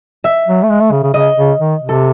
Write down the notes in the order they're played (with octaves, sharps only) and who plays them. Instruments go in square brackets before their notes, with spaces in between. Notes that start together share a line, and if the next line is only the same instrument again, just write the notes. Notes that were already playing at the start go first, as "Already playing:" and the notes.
[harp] E5
[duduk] F#3
A3
G#3
A3
C#3
C#3
[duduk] C#3 [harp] D#5
[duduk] C#3
D#3
C3
[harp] A4